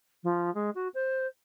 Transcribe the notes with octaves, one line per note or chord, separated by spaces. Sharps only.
F3
G#3
F#4
C5